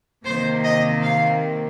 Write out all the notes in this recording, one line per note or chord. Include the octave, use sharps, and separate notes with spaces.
C3 D#3 A#3 C5
D#5
F5